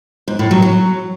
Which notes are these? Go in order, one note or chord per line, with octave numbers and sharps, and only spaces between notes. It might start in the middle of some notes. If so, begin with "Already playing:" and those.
G#2
A2
F#3
F#3